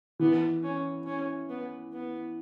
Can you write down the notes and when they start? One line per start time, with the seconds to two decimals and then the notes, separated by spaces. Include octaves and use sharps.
0.19 E3 B3
0.64 C#4
1.06 C#4
1.49 B3
1.92 B3